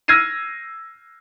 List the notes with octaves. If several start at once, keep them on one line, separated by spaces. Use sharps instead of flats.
E6 F6 G#6 A#6 C7 D#7